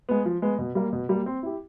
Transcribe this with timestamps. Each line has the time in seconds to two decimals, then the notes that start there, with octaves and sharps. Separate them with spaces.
0.09 G#3 B3
0.26 F3
0.42 G#3 B3
0.59 B2
0.75 G3 A#3
0.93 B2
1.09 G3 A#3
1.26 C4
1.43 E4 G4